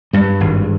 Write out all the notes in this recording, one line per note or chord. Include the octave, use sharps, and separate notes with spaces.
G2 G3
G#1